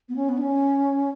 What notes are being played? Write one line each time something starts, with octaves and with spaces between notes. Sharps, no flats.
B3
C#4
B3
D4
C#4